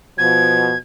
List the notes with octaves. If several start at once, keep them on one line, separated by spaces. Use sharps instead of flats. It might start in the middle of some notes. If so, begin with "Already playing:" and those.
B2 F3 G#6